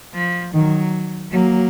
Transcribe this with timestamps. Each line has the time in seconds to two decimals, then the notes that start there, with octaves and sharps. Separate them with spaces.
0.15 F3
0.54 D#3 F#3
1.32 F#3 A#3